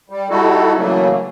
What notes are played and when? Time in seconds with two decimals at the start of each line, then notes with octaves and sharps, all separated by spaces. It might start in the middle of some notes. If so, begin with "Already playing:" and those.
0.10 G3
0.30 G3 D#4 E4 F#4 A4
0.76 C#3 E3 F#3 A3 A#3